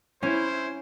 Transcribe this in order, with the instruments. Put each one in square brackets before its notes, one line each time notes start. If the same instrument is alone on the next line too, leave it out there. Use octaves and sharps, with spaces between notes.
[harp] C#4 [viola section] E4 [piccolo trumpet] C5